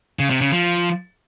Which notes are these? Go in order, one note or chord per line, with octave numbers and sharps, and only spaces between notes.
C#3
C3
C#3
F3